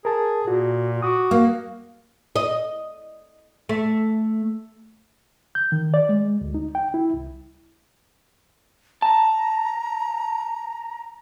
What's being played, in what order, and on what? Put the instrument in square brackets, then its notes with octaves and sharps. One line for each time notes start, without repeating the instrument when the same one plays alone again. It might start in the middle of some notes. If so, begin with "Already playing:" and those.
[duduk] G#4 [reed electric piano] A#4 A5
[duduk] A#2 [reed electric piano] F#4
[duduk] F#4 [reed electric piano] D6 D#6
[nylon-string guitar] A#3 [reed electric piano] F5
[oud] D#5
A3
[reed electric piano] G6
D#3
D5
G#3
D2
D#4
G5
E4
C2
[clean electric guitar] A5 [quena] A#5